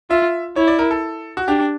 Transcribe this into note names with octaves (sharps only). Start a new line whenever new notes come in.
F4 E5
E4 C#5
D5
A#4
A4
F#4
D4 G4